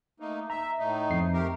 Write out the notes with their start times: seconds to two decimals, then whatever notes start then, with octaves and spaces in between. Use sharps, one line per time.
0.20 A3 A#3 D#4
0.50 E5 A#5
0.79 A2 A3 D#4
1.10 F2 C7
1.33 A3 G4 A#4